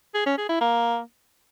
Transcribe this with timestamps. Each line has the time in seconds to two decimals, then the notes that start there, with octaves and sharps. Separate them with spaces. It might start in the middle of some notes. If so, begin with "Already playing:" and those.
0.14 G#4
0.26 C#4
0.38 G#4
0.49 E4
0.61 A#3